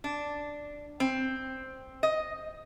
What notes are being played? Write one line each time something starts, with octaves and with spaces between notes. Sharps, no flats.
D4
C4
D#5